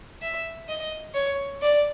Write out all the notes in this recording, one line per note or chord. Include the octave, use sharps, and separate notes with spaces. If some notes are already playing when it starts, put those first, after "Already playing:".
E5
D#5
C#5
D5